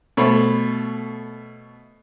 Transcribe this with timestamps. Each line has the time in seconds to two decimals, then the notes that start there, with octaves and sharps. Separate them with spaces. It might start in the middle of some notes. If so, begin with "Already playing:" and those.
0.17 B2 A3 C5 C#5 B5